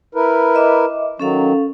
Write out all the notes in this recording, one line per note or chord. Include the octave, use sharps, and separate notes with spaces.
E4 A#4 B4
D#5 E5 D6
D#3 F#3 C#4 A4 F5